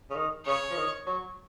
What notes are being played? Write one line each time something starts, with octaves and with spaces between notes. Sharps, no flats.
C#3
D#3
C#3 C#5
F3
D#3
F#3